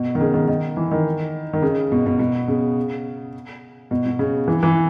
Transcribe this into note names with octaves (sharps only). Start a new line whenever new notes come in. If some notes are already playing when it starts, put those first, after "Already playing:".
Already playing: B2
D#3
C#3
D#3
D#3
E3
D#3
D#3
C#3
B2
B2
B2
C#3
B2
B2
C#3
E3
E3